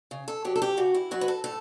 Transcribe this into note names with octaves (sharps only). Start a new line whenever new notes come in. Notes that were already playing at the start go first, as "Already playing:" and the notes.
C#3
A4
F#3 G4
A4
G4
C#3 F#4
E4
F#3 F#4
B4
A4
A2 A4